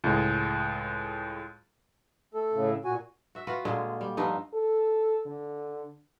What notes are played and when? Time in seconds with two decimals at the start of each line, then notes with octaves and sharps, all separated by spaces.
0.04 C#2 A2 G#3
2.34 A3 A4
2.52 A2 C#3
2.85 A#2 F#4 G#5
3.35 F#4 E5
3.47 F4 F#4 B4
3.65 A#2 D3 G#3
4.01 G3
4.17 G2 F3 B3 D#4
4.54 A4
5.26 D3